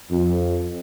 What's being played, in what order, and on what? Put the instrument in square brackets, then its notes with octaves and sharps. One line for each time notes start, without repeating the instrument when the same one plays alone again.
[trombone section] F2